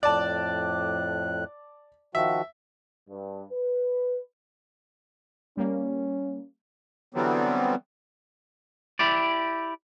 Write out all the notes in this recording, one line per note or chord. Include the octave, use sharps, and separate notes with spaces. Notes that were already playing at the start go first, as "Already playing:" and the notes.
F2 A2 D5 A5 F#6
D#3 F3 F#4 E5
G2
B4
G3 A#3 C#4
D3 E3 F#3 G3 B3 C4
E4 G4 D5